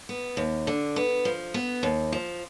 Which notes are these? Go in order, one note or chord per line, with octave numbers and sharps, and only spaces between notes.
B3
D#2
D3
B3
F3
B3
D#2
F3